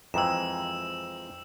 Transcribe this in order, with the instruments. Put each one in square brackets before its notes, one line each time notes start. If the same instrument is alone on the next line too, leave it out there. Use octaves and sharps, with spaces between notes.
[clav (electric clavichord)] F2 E3 G#3 [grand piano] G5 A#5 [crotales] E6 E7